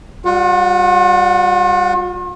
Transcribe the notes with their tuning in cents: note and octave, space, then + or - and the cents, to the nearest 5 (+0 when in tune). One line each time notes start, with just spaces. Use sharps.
G3 +0 F4 +45 F#5 +0